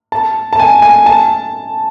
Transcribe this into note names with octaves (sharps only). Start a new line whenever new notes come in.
A5
A5
G#5
G#5
A5